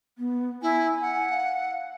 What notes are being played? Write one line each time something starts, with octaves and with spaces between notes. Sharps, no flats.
B3
E4 G#5
F#5
F5